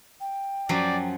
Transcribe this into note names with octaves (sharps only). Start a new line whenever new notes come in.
G5
F#2 F3 F#3 D5